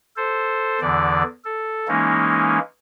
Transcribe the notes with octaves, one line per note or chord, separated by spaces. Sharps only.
A4 C5
E2 D3 E3 D5
A4
E3 G#3 A#3 C#4 D#4